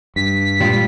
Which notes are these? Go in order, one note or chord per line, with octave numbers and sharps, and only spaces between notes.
G2 B6
A#2 G3 G#3 F4